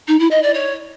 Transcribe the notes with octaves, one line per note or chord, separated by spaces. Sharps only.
D#4
E4
D#5
D5
C#5